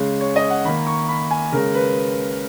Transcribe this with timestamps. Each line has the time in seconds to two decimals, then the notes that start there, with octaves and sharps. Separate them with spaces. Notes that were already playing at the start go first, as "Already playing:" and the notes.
Already playing: C#3 G#3
0.21 C#5
0.36 D#5
0.50 F#5
0.65 D#3 A#3 B5
0.87 C#6
1.08 B5
1.31 G#5
1.52 C#3 G#3 A#4
1.74 B4